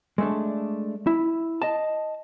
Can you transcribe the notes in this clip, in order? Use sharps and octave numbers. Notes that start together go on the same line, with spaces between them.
G#3 A3 D4
E4
D#5 A5